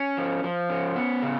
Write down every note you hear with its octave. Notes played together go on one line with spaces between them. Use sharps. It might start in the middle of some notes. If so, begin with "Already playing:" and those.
Already playing: C#4
F3
F3
C#4
B3
C#3